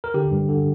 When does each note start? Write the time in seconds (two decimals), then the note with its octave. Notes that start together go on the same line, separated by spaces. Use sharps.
0.04 A#4
0.14 D3 G4
0.31 G2
0.49 D3